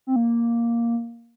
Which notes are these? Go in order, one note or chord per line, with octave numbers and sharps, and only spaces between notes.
C4
A#3